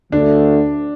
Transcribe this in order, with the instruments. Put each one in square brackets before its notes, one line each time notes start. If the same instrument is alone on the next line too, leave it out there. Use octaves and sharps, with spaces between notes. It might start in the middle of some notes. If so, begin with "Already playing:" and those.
[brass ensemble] D2 D3 A3 [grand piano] D4